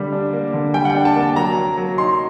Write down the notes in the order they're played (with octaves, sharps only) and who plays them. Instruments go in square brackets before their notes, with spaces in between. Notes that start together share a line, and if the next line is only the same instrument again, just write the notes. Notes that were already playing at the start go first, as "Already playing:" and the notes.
Already playing: [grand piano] D3 G3 A#3
D4
A#3
D3
G3 G5
F#5
D4 G5
A5
A#3 A5
F#3 A#5
A#3
F#3
D#4 C6